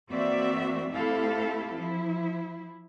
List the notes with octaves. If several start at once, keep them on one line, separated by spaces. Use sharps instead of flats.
E3 A#3 C4 F#4 D5 E5
A3 C4 E4 G4 A4 F5
F3 E4